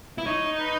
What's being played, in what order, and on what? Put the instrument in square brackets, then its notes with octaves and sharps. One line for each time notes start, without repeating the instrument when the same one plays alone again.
[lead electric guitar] E4
[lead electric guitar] D#4 [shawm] C#5
[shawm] B4